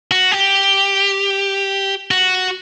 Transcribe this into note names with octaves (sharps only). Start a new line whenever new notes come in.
F#4
G4
F#4